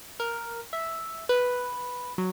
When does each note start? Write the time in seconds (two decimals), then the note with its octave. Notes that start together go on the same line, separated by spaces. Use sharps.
0.20 A#4
0.73 E5
1.29 B4
2.18 F#3